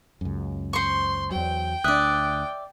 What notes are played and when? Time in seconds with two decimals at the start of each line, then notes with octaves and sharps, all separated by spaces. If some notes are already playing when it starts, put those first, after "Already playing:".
0.21 C#2 F#2
0.73 C5 C6 C#6
1.31 E2 F#3 G5
1.84 D2 D4 D5 E5 D#6 F#6